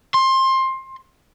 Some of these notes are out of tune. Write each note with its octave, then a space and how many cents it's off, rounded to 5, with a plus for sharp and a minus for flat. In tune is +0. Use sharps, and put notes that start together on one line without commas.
C6 +20